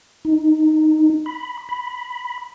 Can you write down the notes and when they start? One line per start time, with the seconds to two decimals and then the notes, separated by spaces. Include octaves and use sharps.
0.25 D#4
1.26 B5
1.69 B5